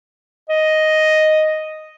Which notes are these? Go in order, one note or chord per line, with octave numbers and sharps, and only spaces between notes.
D#5